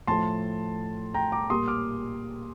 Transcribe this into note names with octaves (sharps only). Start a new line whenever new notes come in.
A2 F3 A3 A5 C6
G5 A#5
A#5 D6
A#2 G3 A#3 C6 D#6
D6 F6